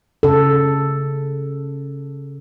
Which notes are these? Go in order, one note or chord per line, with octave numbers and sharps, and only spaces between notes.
C#3 A4